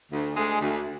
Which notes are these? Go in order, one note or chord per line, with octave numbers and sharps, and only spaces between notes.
D2
D2 G#3
D2